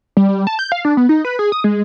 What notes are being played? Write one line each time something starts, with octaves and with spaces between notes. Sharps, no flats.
G3
G3
A5
G6
F5
D4
B3
D#4
B4
G#4
D#6
G#3